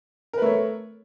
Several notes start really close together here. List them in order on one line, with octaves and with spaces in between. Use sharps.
A#4 B4 A3 C#5